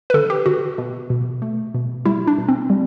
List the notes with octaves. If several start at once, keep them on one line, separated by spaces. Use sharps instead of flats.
B4
D3 A4
G4
D3 F#4
B2
B2
A3
B2
G3 E4
D4
B2
C4
G3